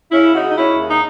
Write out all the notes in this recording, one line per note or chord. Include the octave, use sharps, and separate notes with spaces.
C#3 C#4 E4
D#4 F#4
G#3
D#4
C#4 E4
D#2
D#4